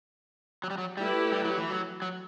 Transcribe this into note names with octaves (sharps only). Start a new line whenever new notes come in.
F#3
G3
F#3
G3 A3 E4 G4 B4
G3
F#3
E3
F#3
F#3